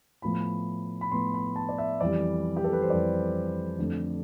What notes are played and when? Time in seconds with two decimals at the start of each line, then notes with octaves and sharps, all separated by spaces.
0.22 A2 F3 B3 B5
1.01 B5
1.11 A2 F3 B3 C6
1.34 B5
1.56 A5
1.69 D5
1.78 E5
2.01 F2 E3 G3 D5
2.56 G4
2.64 A4
2.72 B4
2.82 C5
2.89 F2 E3 G3 D5
3.79 F2 D3 A3